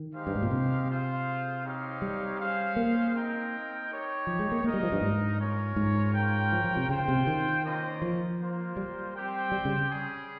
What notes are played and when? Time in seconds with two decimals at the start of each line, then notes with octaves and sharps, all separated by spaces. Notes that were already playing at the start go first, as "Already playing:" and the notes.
Already playing: D#3
0.14 G#3 D#4 G4 C5 F5
0.27 G2
0.35 G#2
0.43 A#2
0.51 C3
0.89 F4 G#4 C5 F5
1.64 C4 D#4 G4 C#5 F5
2.02 G3
2.39 C#4 G#4 C5 F5
2.76 A#3
3.14 C4 D#4 A#4 D#5 G5
3.89 D#4 G4 C#5
4.27 F3
4.39 G#3
4.52 A#3
4.64 A#3 D#4 A#4 D#5
4.74 G3
4.83 F3
4.92 G2
5.02 G#2
5.39 C#4 F4 A#4 C#5
5.76 G#2
6.14 C#4 F4 A#4 C#5 G5
6.52 F3
6.64 F3
6.77 C3
6.89 C#3 F4 C5 G5
7.08 C3
7.27 D#3
7.65 A#3 C#4 F4 C5 D#5
8.02 F3
8.39 A#3 F4 C5
8.77 G3
9.14 C4 G4 C5 G5
9.52 G3
9.65 C#3
9.89 G3 C#4 G#4